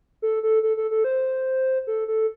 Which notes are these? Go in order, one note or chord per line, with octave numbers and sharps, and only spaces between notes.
A4
A4
A4
A4
A4
C5
A4
A4